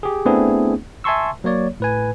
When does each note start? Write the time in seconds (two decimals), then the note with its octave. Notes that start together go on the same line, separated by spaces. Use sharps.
0.03 G4 G#4
0.25 A3 B3 C4 D4 E4 G#4
1.04 E5 G#5 A5 C6 C#6 E6
1.44 F#3 A#3 C#5 D5
1.80 A2 B4 G#5